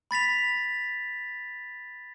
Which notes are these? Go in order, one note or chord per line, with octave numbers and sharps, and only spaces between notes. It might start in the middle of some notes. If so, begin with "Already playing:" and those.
B5 A6 B6 F7